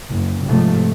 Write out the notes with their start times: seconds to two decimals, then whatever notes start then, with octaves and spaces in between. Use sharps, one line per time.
0.11 F#1
0.46 G#2 C3 F3 A3